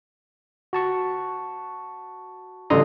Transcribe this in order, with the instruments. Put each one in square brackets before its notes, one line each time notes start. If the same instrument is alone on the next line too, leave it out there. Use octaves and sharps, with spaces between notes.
[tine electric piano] F#4 A5 C#6
[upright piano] A1 D3 [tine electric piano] A#5 C6 D#6